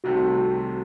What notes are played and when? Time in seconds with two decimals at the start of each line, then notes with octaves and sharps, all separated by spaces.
0.04 C2 C3 D#3 A3 C4 F#4